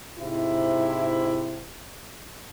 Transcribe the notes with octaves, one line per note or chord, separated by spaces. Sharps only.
G#2 C3 E4